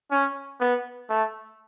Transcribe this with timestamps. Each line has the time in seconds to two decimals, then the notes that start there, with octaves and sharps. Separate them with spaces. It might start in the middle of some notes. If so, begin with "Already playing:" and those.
0.11 C#4
0.60 B3
1.09 A3